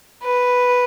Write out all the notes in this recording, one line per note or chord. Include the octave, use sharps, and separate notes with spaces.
B4